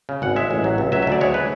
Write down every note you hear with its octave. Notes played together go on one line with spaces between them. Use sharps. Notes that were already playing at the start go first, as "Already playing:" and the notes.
C#3
G#1 F#5
G#3 E5
A1
F#3
C#2
F#3 E5
E5
D2 D5
G#3 C#5
B4